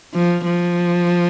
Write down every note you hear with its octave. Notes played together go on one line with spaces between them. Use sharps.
F3
F3